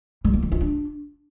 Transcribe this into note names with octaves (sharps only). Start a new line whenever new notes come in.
G3
A#3
D#3
F4
D4